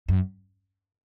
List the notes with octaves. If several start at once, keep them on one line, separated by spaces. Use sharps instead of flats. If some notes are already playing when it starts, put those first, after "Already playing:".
F#2